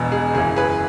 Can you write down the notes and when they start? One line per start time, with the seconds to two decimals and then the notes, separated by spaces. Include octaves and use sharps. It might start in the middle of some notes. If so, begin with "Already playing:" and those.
Already playing: E1 E2 B2
0.12 G#4
0.34 F#1 F#2 E3 G#4
0.56 G#4 B4